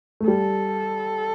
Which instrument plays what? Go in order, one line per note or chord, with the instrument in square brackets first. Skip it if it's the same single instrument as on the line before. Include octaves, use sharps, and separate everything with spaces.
[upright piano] A3
[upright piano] G3 [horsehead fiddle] A4